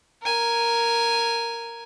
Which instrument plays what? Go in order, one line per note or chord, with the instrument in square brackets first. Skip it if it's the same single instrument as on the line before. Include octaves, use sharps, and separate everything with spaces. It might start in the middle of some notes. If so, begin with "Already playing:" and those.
[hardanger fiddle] A#4 G#5